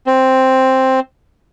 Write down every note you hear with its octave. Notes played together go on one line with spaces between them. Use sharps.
C4